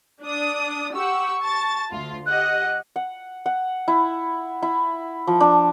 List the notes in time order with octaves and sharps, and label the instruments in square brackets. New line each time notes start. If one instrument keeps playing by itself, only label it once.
[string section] D4 D#6
[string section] G4 F#5 E6 [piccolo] C#6
[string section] A5 A6
D2 F4
[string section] G4 D#5 F#5 [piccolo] F#6
[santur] F#5
F#5
E4
E4
F3
D4